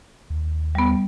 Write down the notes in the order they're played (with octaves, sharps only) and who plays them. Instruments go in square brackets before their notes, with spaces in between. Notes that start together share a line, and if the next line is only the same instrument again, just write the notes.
[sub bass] D#2
[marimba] G3 B3